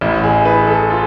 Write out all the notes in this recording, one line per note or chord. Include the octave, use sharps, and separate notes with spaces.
A1 E4
G#4
E3 B4
A4
F4